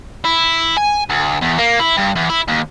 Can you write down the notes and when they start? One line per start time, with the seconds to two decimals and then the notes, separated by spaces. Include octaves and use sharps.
0.25 E4
0.78 G#5
1.10 D2
1.42 E2
1.58 A#3
1.80 E4
1.97 G2
2.15 E2
2.29 E4
2.48 D#2